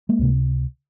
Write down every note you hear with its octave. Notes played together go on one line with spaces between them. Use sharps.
G#3 A#3
C#2 C3